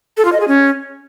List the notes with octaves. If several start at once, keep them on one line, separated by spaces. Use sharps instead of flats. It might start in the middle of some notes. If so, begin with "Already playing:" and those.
A4
F4
D#5
G#4
C#4